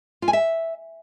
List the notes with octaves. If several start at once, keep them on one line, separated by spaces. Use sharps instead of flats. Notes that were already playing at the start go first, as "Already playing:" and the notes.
F4
G#5
E5